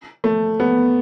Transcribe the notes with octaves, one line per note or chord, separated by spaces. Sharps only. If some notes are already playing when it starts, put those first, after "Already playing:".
A3
B3